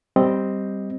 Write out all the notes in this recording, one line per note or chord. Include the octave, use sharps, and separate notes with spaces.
G3 C4 D#5